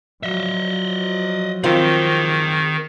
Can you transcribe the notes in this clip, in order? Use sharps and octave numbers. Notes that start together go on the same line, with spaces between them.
F3 F#3 D#5 E5
D#3 C4 D#4 F4 G#4 G5